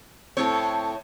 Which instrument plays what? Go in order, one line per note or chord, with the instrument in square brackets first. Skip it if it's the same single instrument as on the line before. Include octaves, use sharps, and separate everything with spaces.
[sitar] A2 C#5 [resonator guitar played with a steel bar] C4 A4